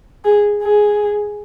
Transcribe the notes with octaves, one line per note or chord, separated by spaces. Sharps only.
G#4
G#4